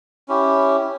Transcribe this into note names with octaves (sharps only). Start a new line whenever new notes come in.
C#4 E4 G4